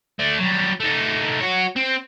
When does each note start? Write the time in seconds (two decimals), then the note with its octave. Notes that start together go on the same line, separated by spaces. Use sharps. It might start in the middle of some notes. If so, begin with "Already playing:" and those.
0.19 A3 D4
0.39 F#3 G3
0.80 A3 D#4
1.40 F#4 C#5
1.76 C4